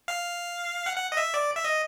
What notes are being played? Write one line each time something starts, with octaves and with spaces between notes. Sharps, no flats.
F5
F#5
F#5
D#5
E5
D5
E5
D#5